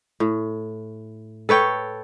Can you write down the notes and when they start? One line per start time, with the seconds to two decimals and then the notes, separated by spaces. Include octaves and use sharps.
0.20 A2
1.49 A4 B4 C#5 G5